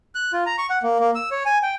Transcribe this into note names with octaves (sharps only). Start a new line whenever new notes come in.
F#6
F4
A#5
C#6
F#5
A#3
A#3
E6
C#5
G#5
G5